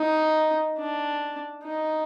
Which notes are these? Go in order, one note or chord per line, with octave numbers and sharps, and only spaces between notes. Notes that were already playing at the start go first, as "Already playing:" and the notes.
Already playing: D#4
D4
D#4